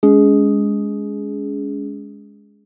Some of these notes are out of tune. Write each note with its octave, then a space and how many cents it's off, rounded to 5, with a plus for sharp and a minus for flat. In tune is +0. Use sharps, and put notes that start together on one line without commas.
G#3 +0 C#4 +35 G#4 +0